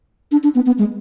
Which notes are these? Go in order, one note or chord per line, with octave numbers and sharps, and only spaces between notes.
D4
D4
B3
B3
G#3